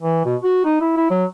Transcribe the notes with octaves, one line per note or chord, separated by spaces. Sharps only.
E3
B2
F#4
D#4
E4
E4
F#3